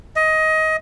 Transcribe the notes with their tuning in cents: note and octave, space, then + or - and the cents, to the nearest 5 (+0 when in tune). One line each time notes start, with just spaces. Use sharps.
D#5 +20